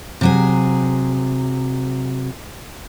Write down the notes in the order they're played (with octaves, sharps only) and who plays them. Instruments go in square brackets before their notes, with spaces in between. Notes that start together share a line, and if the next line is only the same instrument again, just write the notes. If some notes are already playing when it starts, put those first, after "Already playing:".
[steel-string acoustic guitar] C3 F#3 G#4